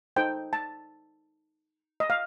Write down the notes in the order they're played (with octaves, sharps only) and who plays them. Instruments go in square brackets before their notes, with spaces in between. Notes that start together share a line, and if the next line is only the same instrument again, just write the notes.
[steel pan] D#4 A4 C5 G5
A5
D#5
F5